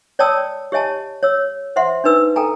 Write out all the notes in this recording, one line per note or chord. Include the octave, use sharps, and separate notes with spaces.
C#5 D5 G5 A5 D#6 E6
G4 C#5 D#5 G#5 A5
C#5 E6
C5 E5 F#5 C6
D4 D#4 B4 E6
A4 G5 G#5 A#5